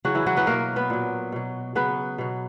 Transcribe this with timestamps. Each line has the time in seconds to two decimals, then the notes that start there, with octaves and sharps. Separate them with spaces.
0.05 C#3 E3 F#3 F#4
0.15 E3 E4
0.26 F#3 F#4
0.36 B3 B4
0.47 B2 F#3 A#3 A#4
0.76 B3 B4
0.90 A#2 F#3
1.32 B2 F#3
1.75 C#3 F#3 B3 B4
2.18 B2 F#3